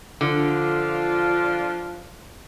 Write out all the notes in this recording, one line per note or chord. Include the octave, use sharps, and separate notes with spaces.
D3 F3 D4 F4